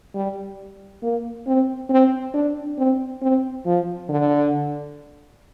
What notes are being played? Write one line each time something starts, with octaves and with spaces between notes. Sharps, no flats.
G3
A#3
C4
C4
D4
C4
C4
F3
D3